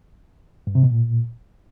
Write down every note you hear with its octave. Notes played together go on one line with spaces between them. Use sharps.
G2
C3
B2
A#2